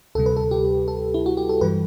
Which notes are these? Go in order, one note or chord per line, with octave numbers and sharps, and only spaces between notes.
D2 C3 G3 A4
B4
A4
G4
A4
E4
F#4
G4
A4
G2 E3 G3 B4